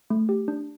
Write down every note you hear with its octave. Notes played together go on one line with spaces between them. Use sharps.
A3
G4
D4